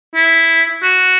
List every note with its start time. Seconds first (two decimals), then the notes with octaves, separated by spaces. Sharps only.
0.15 E4
0.83 F#4